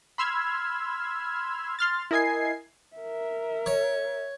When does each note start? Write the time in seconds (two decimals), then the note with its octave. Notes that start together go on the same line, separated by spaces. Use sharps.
0.18 B5 C6 E6 F6 G#6
1.79 C6 F6 A6
2.11 E4 A#4 D#5 G#5 G#6 C7
2.96 A#4 E5
3.66 C#5